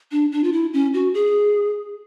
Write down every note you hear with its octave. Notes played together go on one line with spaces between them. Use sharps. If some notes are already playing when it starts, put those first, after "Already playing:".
D4
D4
F4
E4
C#4
F#4
G#4